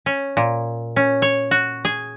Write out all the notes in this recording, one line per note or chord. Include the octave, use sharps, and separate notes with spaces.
C#4
A#2
C#4
C#5
F#4
G#4